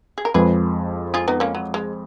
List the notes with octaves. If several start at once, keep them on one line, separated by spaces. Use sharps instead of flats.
G#4
A#4
F2 F3 G#3 G#4 B4
F4 G#4
B3 D#4
A#3 C#4
F#3
G#3